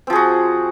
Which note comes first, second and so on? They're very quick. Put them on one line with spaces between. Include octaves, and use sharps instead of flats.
C4 F3 G#4 F#4